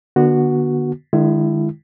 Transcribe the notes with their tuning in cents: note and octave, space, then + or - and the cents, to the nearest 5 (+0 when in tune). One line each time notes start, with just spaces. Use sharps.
D3 +20 B3 -35 F#4 +0
D#3 -40 G#3 +0 E4 +25